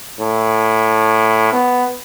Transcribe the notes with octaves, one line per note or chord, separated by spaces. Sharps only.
A2
B3